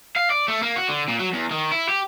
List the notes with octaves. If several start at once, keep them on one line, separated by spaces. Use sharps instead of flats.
F5
D5
A3
A#3
F#4
D3
A#2
F#3
E2
D#3
E4
G4